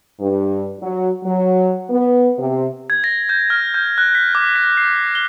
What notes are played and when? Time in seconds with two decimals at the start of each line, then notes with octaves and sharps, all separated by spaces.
0.20 G2
0.80 F#3
1.24 F#3
1.90 B3
2.38 C3
2.90 G#6
3.04 A#6
3.29 G6
3.50 F6
3.74 G6
3.98 F#6
4.15 B6
4.35 D6
4.56 A#6
4.77 C7
5.15 G7